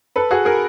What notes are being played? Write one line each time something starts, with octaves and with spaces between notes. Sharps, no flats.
A4 B4
F#4 G#4
G#4 A#4